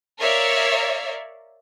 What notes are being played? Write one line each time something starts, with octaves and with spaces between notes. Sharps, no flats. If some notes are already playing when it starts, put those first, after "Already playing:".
A#4 C#5 D5 E5 F5